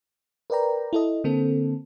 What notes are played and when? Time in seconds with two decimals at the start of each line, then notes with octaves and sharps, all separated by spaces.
0.50 A#4 B4 D5 G5 A#5
0.93 E4 A4 D#5
1.24 D3 A#3 C4 A4